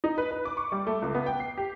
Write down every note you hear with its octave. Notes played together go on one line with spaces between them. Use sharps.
D#4
B4
B4
D6
C#6
G3
A3
C#2
B3
G5
C7
G4